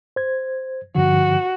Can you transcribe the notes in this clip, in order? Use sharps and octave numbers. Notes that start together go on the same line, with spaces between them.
C5 G#6
G2 D3 F3 F#4